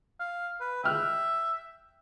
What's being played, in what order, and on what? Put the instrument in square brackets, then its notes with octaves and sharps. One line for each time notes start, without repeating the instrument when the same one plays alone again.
[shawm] F5
B4
[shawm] E5 [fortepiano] G5 F6 F#6